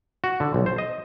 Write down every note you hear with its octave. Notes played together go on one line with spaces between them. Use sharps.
F#4
D3
B1
C5
D#5